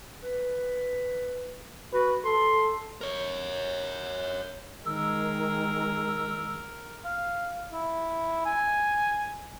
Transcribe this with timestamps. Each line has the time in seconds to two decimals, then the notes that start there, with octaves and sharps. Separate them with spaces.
0.23 B4
1.93 F#4 B4
2.25 A4 C6
3.01 A#4 C#5
4.86 D#3 G#3 A#4 E6
7.04 F5
7.72 E4
8.45 G#5